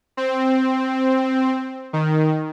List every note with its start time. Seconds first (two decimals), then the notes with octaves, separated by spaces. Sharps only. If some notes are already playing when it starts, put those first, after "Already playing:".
0.17 C4
1.93 D#3